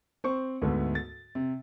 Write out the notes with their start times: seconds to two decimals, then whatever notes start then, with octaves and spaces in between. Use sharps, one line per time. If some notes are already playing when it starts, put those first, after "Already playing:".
0.24 C4 C5 C#6
0.62 D2 G#2 A3 B3
0.95 A6
1.35 C3